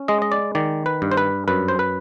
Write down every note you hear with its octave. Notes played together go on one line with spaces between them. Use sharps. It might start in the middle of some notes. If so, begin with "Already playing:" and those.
Already playing: C#4
G#3 D#5
D#5
D5
D#3 D5
B4
G2
C5
B4
F#2 B4
C5
B4